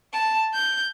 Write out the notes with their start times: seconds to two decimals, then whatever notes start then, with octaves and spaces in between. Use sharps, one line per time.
0.13 A5
0.54 G6